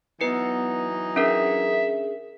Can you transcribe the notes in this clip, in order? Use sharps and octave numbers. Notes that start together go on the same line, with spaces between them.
E3 F#3 B3 D#4 B4 C#7
C#4 D4 G#4 A#4 E5